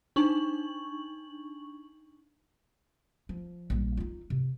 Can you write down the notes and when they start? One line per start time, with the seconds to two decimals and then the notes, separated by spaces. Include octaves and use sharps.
0.16 D4 D#4 C#6 F#7
3.29 F3
3.70 A#1 G3
3.97 D#4 F4
4.30 C3